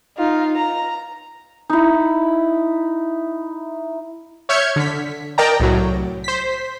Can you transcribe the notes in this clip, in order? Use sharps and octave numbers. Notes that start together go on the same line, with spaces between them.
D#4 F4
A#5
D#4 E4
C#5 E5 F6 G6 G#6 C#7
D3 B6
A#4 D5 D#5 G5 A5 A#5
C2 A2 F#3
C5 B6